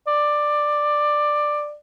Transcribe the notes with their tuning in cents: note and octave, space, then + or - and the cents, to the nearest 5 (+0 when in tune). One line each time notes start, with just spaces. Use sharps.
D5 +10